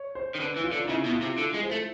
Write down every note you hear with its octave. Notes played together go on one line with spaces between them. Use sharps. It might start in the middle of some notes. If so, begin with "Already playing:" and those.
Already playing: C#5
C5
D#3
D3 B4
E3
F4
D3
D#4
C#3 E4
B2
F4
C3
D3
G#3
C5
A3